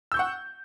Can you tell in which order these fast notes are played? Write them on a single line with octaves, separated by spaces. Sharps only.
E6 G6 C#6 F#5